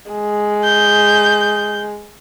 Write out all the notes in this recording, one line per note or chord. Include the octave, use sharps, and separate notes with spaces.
G#3
G6